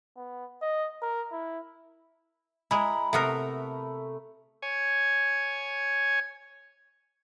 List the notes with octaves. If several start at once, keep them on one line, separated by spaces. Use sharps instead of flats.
B3
D#5
A#4
E4
G#3 E4 A#5 B5
C3 A3 B3 A#4
C#5 G#5